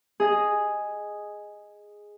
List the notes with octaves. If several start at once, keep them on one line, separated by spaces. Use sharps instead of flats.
G#4 D#5